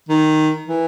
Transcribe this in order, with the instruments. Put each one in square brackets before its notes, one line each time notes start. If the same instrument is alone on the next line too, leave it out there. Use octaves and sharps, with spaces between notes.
[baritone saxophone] D#3
E3